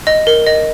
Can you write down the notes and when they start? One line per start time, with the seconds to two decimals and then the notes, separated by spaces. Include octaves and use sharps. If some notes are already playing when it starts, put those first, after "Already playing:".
0.07 D#5
0.27 A#4
0.46 D#5